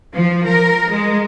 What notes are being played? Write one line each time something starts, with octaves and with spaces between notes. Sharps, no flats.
F3
A#4
G#3